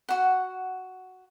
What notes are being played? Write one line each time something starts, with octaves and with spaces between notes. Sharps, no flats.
F#4 F#5